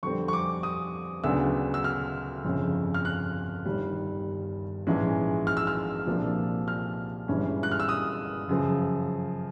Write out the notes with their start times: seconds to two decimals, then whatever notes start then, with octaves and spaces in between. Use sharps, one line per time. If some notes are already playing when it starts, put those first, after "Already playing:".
0.03 F2 D3 G3 C4 C#6
0.28 C#6
0.33 D6
0.63 D#6
1.24 D2 C#3 F#3 B3 D4 E6
1.74 E6
1.84 F6
2.45 G1 F2 C#3
2.94 F6
3.05 F#6
3.66 G1 G2 D#3 G3
4.87 A#1 G#2 E3 G#3 C#4
5.47 F6
5.57 E6
5.67 F6
6.07 C2 A#2 F3 A#3 D4
6.68 F6
7.28 G1 G2 E3 G#3 C#4
7.63 F#6
7.72 F6
7.80 E6
7.89 D#6
8.49 F#2 C#3 F3